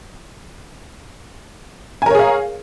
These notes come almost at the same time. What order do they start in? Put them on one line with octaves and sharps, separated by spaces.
G#5 A#4 C#5 G#4 F5